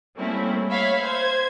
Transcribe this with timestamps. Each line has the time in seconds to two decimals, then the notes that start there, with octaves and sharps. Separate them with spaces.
0.16 G3 A3 A#3 C4 C#4 E4
0.69 C#5 E5 F5 B5 G#6
1.00 C5 G#6